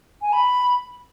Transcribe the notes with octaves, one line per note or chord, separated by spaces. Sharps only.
G#5
B5